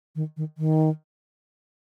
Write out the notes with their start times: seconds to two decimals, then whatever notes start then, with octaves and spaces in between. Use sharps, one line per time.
0.16 D#3
0.37 D#3
0.58 D#3